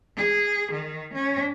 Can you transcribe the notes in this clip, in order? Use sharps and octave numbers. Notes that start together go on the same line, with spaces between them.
G#4
D#3
C#4